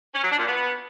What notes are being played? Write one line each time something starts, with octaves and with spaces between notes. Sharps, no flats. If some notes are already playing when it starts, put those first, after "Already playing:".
C#4
F#3
D4
A#2
B3